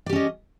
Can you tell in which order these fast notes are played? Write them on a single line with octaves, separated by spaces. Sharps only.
D5 G4 C#4 D#5